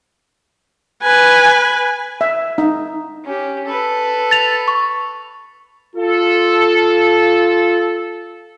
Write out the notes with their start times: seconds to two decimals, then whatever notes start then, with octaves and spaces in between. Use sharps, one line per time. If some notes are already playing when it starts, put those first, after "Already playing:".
1.03 B4 G#5
2.21 E5
2.58 D#4
3.25 C#4 G4
3.66 A4 B4
4.31 A6 F7
4.68 C#6
5.96 F4 A4